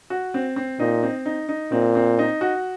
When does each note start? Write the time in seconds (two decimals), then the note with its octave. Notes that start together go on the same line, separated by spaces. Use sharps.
0.10 F#4
0.34 C4
0.56 C4
0.80 A#2 D#4
1.03 C4
1.26 D#4
1.49 D#4
1.72 A#2 C4
1.95 C4
2.19 D#4
2.41 F#4